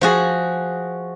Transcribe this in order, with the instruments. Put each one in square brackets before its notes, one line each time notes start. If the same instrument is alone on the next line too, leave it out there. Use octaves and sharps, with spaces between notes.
[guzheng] F3 F#4 G#4